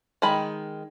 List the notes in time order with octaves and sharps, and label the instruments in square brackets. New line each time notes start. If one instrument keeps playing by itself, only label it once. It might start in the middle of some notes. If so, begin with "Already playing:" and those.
[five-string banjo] D#3 G#3 B5